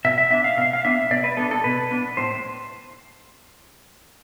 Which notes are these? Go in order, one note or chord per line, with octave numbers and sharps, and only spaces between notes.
B2 E5
E5
B3 D4 E5
F5
B2 F5
F5
B3 D4 E5
B2 D5
B4
B3 D4 A4
A4
B2 B4
B3 D4
A2 C5